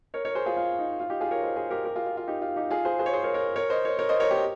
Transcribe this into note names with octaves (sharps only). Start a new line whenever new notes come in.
A#4 C#5
A#4 C#5
G#4 C5
F4 G#4
F4
D#4
F4
D#4 G4
F4 G#4
A#4 C#5
C5 D#5
G#4 C5
G4 A#4
G4 A#4
F4 G#4
F4
F4
D#4 G4
F4
D#4 G4
F4 G#4
G#4 C5
G#4 C5
C#5
G#4 C5
A#4 C#5
A#4 C#5
A#4 C#5
C5 D#5
A#4 C#5
A#4 C#5
C5 D#5
A#4 C#5
G4 A#4